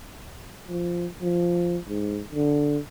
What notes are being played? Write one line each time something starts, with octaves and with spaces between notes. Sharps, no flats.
F3
F3
G#2
D3